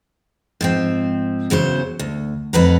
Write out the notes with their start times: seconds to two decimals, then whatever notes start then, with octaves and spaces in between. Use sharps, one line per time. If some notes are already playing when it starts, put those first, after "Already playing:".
0.61 G#2 F3 C4
1.50 E2 C#3 F#3 C5
1.99 D2
2.53 F2 D#4 B4 F#5 A#5